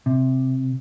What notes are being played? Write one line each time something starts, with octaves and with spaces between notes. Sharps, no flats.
C3